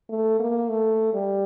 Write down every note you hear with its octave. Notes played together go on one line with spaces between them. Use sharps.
A3
A#3
A3
G3